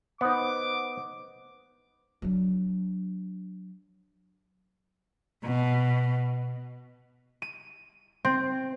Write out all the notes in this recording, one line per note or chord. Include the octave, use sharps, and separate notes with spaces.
B3 D#4 C5 F#5 D6
F#3 D4
B2
D#7
C4